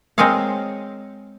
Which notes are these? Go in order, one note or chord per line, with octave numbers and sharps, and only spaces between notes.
G#3 C4 G#4 A#4 C#5 F5